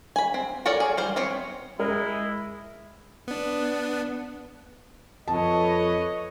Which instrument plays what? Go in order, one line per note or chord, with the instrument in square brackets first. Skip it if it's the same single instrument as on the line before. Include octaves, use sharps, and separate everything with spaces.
[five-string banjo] G#5 B5
C4
F#4 A4 A#4 C#5 D5
G#4
G3 C5 F5
B3 C4 C#5
[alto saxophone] G#3 [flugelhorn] E4 [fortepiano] A#4
[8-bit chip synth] B3 D4
[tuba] F2 [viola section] A4 B4 C#5 [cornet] D#5 [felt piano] A5